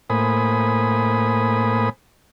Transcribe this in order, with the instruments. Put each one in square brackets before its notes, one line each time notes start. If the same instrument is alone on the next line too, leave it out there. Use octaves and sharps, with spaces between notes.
[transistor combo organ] A2 A#3 C5 G#5 B5 D#6